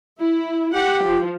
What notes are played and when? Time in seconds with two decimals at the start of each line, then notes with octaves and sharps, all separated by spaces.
0.20 E4
0.74 G4 F#5
1.04 F3